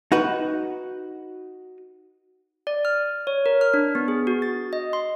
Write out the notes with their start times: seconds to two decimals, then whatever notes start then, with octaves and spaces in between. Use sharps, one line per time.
0.12 D#4 F#4 B4
2.67 D5
2.85 F6
3.27 C#5
3.46 A#4
3.61 F6
3.74 D4
3.95 B3
4.08 G#4
4.27 F#4
4.42 A6
4.73 D#5
4.93 C6